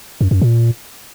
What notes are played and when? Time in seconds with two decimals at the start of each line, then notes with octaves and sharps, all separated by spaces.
0.21 F#2
0.31 F#2
0.42 A#2